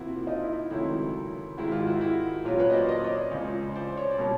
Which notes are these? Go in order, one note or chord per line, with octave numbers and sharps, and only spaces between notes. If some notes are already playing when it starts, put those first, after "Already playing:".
Already playing: C3 F3 A#3 E4 F#4
D#4 F4
E4
C#2 C3 D#3 F#3 A3 E4
G#2 D#3 G#3 E4 F#4
F4 G4
E4 F#4
E4 F#4
A#2 F#3 A#3 C#4 F4 G4
B4 C#5
D#5
C5 D5
D#5
D5
C#5 D#5
C#2 C#3 F3
C5 D5
C#5
D5
B2 G3 A#3 C#4